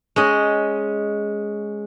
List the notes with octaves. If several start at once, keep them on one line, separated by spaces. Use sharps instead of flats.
G#3 C#4 D#5